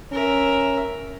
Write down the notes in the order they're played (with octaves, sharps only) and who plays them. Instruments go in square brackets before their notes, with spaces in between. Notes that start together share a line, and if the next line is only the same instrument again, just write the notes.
[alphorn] C#4 [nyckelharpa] A#4 E5